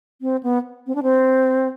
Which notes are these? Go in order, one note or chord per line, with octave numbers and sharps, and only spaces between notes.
C4
B3
C4
D4
C4